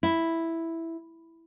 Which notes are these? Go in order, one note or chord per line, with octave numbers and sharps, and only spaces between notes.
E4